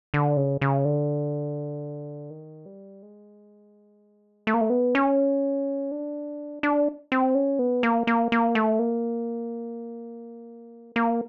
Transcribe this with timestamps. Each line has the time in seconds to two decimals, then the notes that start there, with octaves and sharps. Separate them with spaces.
0.14 D3
0.37 C#3
0.61 C#3
0.85 D3
2.30 D#3
2.66 G3
3.03 G#3
4.47 A3
4.54 A#3
4.61 A3
4.70 B3
4.95 C#4
5.91 D4
6.63 D4
7.12 C4
7.35 C#4
7.59 B3
7.83 A#3
8.07 A#3
8.32 A#3
8.55 A3
8.79 A#3
10.96 A#3